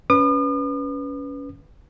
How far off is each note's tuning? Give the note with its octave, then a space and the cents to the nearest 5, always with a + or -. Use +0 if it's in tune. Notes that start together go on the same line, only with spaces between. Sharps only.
C#4 +20 B4 +0 D#6 -45